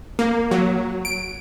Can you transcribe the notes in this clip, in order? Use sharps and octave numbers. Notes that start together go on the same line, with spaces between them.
A#3
F#3
D7